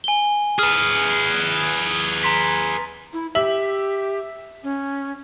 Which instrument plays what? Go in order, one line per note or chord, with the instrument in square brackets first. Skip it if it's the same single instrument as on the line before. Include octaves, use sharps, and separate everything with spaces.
[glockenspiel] G#5 G7
[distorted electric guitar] G#4 B4 [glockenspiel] D#6 F6
[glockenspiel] A#5 C6 B6
[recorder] E4
[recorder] G4 [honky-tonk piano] E5 F#7
[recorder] C#4